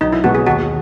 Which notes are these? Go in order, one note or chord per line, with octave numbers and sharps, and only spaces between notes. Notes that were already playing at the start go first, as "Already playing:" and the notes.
B1 D#4
E4
B2 G#3 B3 F#4
G#4
D#2 F#4